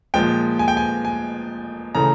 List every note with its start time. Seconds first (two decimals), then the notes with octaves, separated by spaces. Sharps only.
0.14 A#2 F3 G#3 G5
0.59 G#5
0.68 G5
0.77 G#5
1.05 G#5
1.95 C#3 E3 A3 A#5